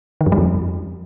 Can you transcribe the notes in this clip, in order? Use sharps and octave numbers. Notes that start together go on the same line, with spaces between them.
D#3
F#2
G3
F2